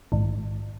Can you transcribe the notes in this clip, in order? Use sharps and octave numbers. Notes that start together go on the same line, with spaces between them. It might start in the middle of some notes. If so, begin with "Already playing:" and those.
A#1 G#2 D#3